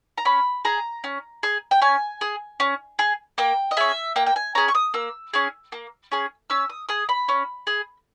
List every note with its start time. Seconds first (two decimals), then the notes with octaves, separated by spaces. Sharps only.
0.18 A#5
0.25 C#4 B5
0.65 G#4 A#5
1.04 C#4
1.43 G#4
1.71 G5
1.82 C#4 G#5
2.21 G#4
2.60 C#4
2.99 G#4
3.38 A#3 G5
3.71 D#5
3.77 C#4 G#4 E5
4.16 A#3 G5
4.26 G5
4.36 G#5
4.55 C#4 G#4 A#5
4.68 C#6
4.75 D#6
4.94 A#3 E6
5.33 C#4 G#4
5.72 A#3
6.12 C#4 G#4
6.50 C#4 E6
6.69 D#6
6.89 G#4 D#6
7.09 B5
7.29 C#4
7.67 G#4